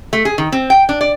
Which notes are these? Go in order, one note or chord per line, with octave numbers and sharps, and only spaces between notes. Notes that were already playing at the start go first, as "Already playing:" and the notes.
A3
G#4
D#3
C4
G5
D4
D5